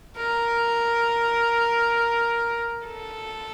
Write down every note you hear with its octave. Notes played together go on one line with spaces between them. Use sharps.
A#4
A4